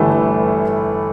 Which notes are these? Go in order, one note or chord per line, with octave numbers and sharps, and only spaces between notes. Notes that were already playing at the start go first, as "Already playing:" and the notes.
Already playing: G1 G2 E3 A3 A4